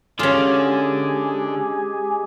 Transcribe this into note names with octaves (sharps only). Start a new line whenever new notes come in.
D3 G#3 C#4 F4 G4 G#4 G#5